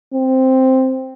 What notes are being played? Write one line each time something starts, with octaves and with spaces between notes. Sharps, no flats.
C4